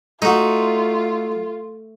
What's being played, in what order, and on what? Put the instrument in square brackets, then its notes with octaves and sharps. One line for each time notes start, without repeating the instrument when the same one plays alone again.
[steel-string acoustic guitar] A3 [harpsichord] D#4 F#4 [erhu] F4